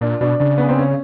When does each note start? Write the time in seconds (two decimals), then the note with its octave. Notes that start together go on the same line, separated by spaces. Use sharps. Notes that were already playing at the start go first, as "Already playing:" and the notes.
0.01 A#2 D4
0.21 B2 D4
0.40 C#3 D4
0.58 B3
0.69 C4
0.78 C#4